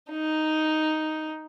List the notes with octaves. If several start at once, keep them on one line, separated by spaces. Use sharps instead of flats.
D#4